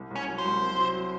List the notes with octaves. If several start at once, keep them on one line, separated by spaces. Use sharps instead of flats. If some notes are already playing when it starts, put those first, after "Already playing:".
Already playing: C2
C2 C#4
F#3
C5
C2
C4
F#3